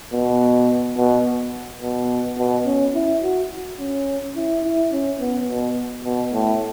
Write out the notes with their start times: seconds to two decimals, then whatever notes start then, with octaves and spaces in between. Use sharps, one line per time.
0.13 B2
0.97 B2
1.81 B2
2.38 B2
2.66 C#4
2.94 E4
3.23 F#4
3.79 C#4
4.36 E4
4.63 E4
4.92 C#4
5.20 B3
5.49 B2
6.05 B2
6.33 A2